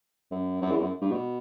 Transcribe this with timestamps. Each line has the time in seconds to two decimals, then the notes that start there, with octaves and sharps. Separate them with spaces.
0.31 F#2
0.62 F#2
0.71 E2
0.81 F#2
1.02 G2
1.11 B2